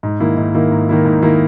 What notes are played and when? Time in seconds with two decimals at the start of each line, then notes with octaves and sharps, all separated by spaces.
0.03 G#2
0.20 D#3 A#3 E4
0.37 G#2
0.55 D#3 A#3 E4
0.72 G#2
0.89 D#3 A#3 E4
1.05 G#2
1.22 D#3 A#3 E4